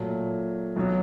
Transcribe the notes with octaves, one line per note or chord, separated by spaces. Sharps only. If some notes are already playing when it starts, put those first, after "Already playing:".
Already playing: A#2 F#3 A3
B1 B2 F#3